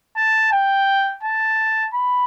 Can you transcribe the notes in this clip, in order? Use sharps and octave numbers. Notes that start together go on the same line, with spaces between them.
A5
G5
A5
B5